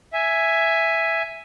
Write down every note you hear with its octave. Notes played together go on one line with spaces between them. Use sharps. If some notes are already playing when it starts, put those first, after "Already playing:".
E5 G#5